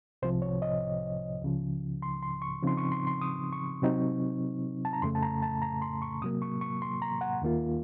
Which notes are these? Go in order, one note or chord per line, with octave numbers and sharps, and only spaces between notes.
C2 C3 F3 C5
C#5
D#5
C#2 C#3 F3
C6
C6
C#6
C#3 F3 C4 D#4 C6
C#6
C6
C6
D#6
C#6
C3 F#3 C4 D#4
A5
A#5
F2 C#3 A3 C6
A5
A#5
A5
A#5
C6
C#6
C3 F#3 A#3 D#6
C#6
C#6
C6
A#5
F#5
D#2 D#3 A#3 F4